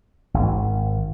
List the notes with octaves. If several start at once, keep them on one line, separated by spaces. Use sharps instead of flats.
G#1